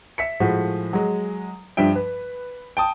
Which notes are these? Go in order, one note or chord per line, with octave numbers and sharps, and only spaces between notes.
E5 B6 C#7
A2 F3 G#3 F#4
F#3 G#3
G2 F3 G3 E5 G5
B4
G5 A5 D#6